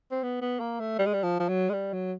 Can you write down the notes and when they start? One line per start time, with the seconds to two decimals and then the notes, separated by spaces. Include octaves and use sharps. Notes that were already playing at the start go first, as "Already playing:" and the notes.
0.11 C4
0.23 B3
0.41 B3
0.60 A#3
0.80 A3
0.99 G3
1.06 G#3
1.13 G3
1.23 F3
1.40 F3
1.49 F#3
1.69 G#3
1.73 G3
1.93 F#3